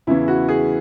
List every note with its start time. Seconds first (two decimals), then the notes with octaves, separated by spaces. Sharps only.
0.07 E2 C#3 E3 E4
0.28 F#4
0.49 G#4